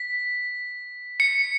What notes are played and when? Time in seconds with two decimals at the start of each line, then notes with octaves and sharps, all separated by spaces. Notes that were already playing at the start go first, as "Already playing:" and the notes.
Already playing: B6
1.20 C#7